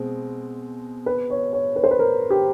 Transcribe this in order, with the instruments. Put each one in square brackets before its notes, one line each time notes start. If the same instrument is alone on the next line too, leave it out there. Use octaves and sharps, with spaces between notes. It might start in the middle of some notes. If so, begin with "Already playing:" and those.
Already playing: [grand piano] B2 G#3 C4
[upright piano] B4
C#5
C#5
B4
C5
B4
A#4
G4